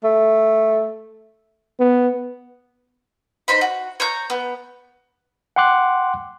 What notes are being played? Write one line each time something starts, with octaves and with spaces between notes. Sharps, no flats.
A3
B3
D#4 C5 B5
F#4
C#5 A#5 G6
B3
F#5 G5 C6 D6 F#6